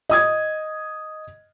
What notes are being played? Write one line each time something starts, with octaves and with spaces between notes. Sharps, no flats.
D#5 D#6 G#6